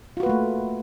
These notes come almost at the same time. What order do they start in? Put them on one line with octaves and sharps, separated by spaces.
F4 F#4 B4 A#3 A3